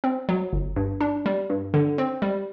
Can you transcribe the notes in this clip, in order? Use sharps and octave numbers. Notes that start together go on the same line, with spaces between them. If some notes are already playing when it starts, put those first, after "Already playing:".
C4
F#3
G1
G2
D4
G3
G2
D3
C4
G3